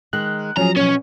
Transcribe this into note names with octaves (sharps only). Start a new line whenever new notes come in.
D#3 G#3 F#6
F3 F#3 C#4 G#4 A#5
B2 C#4 C#5